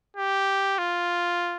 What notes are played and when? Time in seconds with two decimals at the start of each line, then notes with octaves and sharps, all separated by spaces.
0.17 G4
0.78 F4